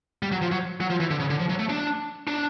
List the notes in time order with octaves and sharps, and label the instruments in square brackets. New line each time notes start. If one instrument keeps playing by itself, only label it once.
[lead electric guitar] G3
F#3
F3
F#3
F#3
F3
E3
D3
C#3
D3
F3
F#3
A3
D4
D4